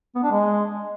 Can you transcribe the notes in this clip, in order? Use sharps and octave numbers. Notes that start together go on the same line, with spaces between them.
B3
D4
G#3